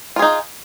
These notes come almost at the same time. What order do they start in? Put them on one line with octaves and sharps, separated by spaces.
F4 G#4 D#4